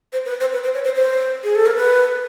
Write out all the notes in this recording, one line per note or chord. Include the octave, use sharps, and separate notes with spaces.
C5
B4
C5
B4
C5
C#5
C5
C5
G#4
A4
A#4
B4